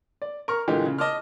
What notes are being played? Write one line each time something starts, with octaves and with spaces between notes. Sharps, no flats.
D5
A#4 C#6 F6
A#2 D3 E3 G#3 G4
C#3
D#5 A5 D6 F6